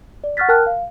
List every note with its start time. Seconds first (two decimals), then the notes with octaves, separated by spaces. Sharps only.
0.24 D5
0.37 F#5 C#6 F6 F#6 A6 B6
0.49 A#4 G5 A5 F6 F#6
0.66 F5